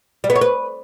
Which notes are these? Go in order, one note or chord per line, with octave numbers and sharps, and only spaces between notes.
G3
B3
C#5
B4